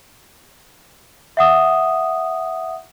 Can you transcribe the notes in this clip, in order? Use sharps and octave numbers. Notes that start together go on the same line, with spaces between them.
E5 F#5 D#6